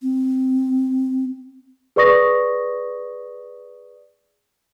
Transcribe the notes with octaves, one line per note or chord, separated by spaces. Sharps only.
C4
G#4 B4 D5 C#6 D#6 A#6